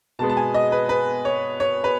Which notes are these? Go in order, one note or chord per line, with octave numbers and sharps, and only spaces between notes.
B2 G#3 B3 A5
A5
G#5
D#5
B4
B4
C#5
C#5
B4